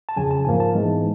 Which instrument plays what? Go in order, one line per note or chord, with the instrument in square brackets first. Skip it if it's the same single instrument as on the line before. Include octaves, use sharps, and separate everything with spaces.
[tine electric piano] A5
F2 C#3 F#3 G#5
A5
G#2 F3 A#3 G#5
A5
G#2 E3 G#3 B3